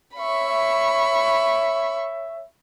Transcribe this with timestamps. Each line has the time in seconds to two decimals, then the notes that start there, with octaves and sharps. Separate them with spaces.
0.16 C#5 E5 B5 C#6